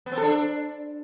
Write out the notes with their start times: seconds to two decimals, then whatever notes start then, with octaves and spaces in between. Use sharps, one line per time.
0.06 B3
0.12 C4
0.17 A4
0.23 D4